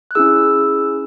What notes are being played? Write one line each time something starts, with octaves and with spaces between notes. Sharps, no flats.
F#6
C#4 E4 G#4 E6